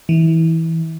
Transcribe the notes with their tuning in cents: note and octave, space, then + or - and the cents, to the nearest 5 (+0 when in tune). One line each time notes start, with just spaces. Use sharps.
E3 -20